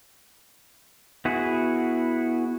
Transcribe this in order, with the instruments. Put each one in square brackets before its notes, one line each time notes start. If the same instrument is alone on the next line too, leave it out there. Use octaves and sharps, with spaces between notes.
[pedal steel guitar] B3 E4 F#4 G#4